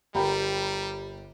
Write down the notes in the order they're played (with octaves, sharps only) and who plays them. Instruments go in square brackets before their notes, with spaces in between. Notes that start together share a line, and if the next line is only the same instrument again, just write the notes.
[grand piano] G1 A#4 [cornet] G3 [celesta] G4 [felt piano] G5 A#5 B5